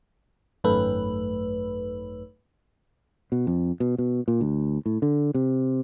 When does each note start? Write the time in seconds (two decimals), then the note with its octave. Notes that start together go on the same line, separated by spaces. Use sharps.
0.64 G#1 F#2 A3 B4
3.32 B2
3.47 F2
3.80 B2
3.98 B2
4.28 A#2
4.41 D2
4.86 A2
5.02 D3
5.34 C3